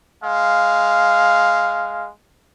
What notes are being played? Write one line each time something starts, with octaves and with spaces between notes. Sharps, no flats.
G#3 F5